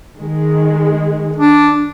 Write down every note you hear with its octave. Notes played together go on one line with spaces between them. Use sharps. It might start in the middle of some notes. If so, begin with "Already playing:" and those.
D#3 G#3
D4